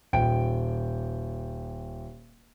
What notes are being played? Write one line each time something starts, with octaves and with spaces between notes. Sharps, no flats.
D#1 G5 D7